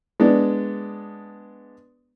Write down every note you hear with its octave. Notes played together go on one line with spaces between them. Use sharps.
G#3 B3 D4